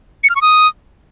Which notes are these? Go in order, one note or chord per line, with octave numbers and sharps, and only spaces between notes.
C#7
F6
C#6
D#6